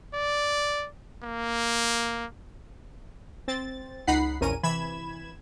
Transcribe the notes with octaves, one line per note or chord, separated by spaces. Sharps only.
D5
A#3
C4 A6
C#2 D#4 F#5 B5 C7
A#1 E2 A#2 C#4 A#4 D#7
C3 E3 B5 G#6 E7